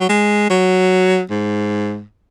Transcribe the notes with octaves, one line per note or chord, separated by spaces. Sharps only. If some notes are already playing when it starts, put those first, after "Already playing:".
F#3
G#3
F#3
G#2